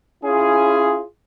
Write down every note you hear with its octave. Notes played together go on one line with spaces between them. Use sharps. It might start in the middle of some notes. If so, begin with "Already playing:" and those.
C#4 E4 F4 G#4